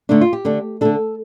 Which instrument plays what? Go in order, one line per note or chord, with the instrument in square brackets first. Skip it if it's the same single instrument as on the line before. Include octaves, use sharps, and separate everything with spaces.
[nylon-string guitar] D3 A3 D4 D#4
F4
G4
D3 A3 D4
D3 A3 D4 A4